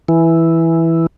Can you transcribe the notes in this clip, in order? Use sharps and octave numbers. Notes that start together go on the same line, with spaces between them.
E3